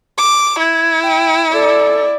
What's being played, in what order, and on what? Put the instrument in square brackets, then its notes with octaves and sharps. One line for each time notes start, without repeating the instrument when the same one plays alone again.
[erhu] D6
[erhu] E4 [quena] G#6
[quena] G5
[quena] A4 [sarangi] D5